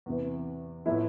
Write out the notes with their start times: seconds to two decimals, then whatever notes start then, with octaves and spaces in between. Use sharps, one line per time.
0.06 E2 C3 E3
0.86 A2 F3 B3 E4